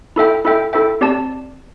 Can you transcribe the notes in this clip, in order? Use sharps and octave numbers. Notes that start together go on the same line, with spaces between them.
E4 A4 E5 G5
E4 A4 E5 G5
E4 A4 E5 G5
C4 G4 D5 A5